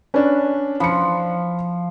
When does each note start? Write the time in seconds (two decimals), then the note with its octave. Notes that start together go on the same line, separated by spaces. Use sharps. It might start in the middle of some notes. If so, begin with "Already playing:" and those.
0.14 C#4 D4 B4
0.80 F3 B5 C#7